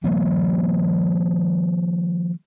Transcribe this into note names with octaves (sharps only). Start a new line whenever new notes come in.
D#3 F3 G3 A#3